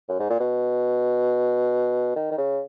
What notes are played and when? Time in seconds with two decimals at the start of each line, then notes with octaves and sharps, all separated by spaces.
0.08 F#2
0.19 G#2
0.30 A#2
0.40 B2
2.16 D#3
2.31 D#3
2.38 C#3